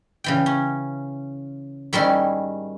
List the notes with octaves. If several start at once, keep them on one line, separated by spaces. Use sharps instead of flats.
C#3 E3 G5
C#4
G#2 D#3 G3 C#4 E4 C6